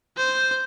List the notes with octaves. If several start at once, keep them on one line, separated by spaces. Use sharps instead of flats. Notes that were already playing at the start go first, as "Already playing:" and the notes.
C5